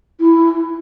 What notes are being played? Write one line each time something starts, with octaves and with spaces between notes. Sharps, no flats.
E4